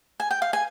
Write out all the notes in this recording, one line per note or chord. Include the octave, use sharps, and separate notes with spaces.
G#5
G5
F5
G#5